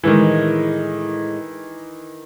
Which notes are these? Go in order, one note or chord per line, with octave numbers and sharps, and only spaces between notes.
A2 D#3 E3 G#3